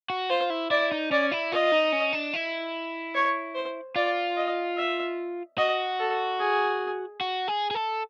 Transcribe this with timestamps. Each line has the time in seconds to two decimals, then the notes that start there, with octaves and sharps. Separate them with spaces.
0.10 F#4
0.30 F4 C5
0.50 E4
0.71 E4 D5
0.92 D#4
1.11 C#4 D5
1.31 E4
1.52 F4 D#5
1.72 D#4
1.92 C#4
2.13 D4
2.34 E4
3.14 C#5
3.54 C5
3.96 F4 D5
4.36 D#5
4.77 E5
5.58 F#4 D#5
5.99 A4
6.39 G#4
7.21 F#4
7.48 G#4
7.71 G#4
7.74 A4